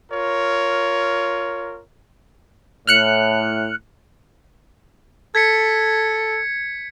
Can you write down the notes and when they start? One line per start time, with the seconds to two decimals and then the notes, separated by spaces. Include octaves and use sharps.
0.11 F4 A#4 C#5
2.87 A2 F6 F#6 C#7
5.35 A4 G#6 B6 C#7